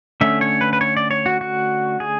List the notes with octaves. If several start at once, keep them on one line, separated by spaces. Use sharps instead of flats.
D3 A3 C#4 E5
C#5
B4
B4
C#5
D5
C#5
F#4
F#4
G#4